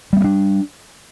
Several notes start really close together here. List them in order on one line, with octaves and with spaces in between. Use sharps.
G3 B3 A#3 D4